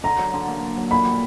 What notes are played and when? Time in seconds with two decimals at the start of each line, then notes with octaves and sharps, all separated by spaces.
0.03 D3 A#5
0.18 F#3
0.33 D3
0.48 A#3
0.62 F#3
0.77 F#3
0.91 A#2 B5
1.06 G3